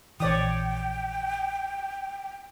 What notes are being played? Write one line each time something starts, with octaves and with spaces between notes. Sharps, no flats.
A#1 E3 C#5 D5 G5 D#6